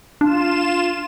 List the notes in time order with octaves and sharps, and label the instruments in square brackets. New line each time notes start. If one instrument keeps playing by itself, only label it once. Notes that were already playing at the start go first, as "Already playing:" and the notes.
[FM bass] D4 [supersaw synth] F4 E7